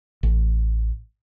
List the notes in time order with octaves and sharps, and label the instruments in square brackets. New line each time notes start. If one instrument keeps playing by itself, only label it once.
[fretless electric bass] A1